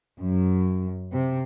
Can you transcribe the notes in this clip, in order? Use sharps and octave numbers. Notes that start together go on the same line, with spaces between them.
F#2
C3